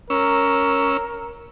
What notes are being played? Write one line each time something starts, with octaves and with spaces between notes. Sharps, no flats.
C#4 A#4 E6